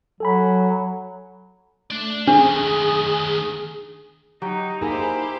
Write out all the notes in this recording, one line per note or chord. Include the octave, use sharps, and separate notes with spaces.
F#3 A4 G#5 B5
A3 D4 D5
D#3 A3 D4 G#4
F#3 D#4 G4
A#3 D#4 E4 G4 G#4 C5 A#5